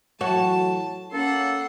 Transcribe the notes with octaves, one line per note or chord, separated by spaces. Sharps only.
A2 E3 F#3 F#4 C#5 A5
A#3 C#4 A4 F#5 C6